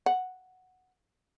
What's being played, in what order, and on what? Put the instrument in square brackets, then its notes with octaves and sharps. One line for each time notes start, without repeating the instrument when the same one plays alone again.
[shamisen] F#5